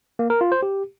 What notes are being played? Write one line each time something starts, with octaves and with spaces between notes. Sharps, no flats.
A#3
A#4
F4
C5
G4